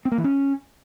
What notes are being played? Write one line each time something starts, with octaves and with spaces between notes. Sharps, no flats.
C4
A#3
E3
C#4